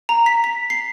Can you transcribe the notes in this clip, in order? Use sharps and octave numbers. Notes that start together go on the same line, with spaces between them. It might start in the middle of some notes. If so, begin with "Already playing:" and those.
A#5
B6
B6
C7